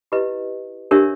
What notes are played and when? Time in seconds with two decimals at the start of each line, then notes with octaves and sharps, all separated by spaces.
0.12 E4 G4 B4 D#5
0.91 D4 G4 A#4 C#5 E5